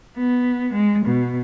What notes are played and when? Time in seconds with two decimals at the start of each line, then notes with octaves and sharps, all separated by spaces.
0.17 B3
0.73 G#3
1.05 B2